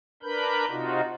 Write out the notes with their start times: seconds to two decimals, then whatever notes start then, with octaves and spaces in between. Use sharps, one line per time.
0.23 D4 A#4 B4 B5 G6
0.69 C3 D#4 F4 F#4